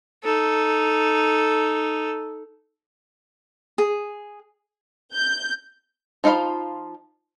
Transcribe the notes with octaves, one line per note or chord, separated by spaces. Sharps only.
D#4 A4
G#4
G6
F3 D#4 F4 F5 B5